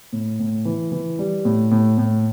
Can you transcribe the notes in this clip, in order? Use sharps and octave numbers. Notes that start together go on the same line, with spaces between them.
A2
A2
E3
E3
G3
A2
A2
A2